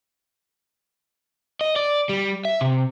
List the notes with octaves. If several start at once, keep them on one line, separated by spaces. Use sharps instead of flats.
D#5
D5
G3
E5
C3